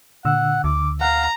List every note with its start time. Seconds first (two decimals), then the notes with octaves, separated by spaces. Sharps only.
0.25 A#2 D3 F#5 E6
0.64 D2 D6
1.01 F5 F#5 A#5